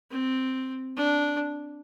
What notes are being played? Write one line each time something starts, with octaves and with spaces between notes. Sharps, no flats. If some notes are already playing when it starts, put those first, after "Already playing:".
C4
D4